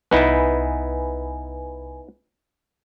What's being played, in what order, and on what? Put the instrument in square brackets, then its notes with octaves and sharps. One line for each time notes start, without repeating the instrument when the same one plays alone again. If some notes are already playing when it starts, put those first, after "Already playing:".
[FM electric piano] C2 B4 G#5 [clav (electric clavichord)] B3 D#4 E4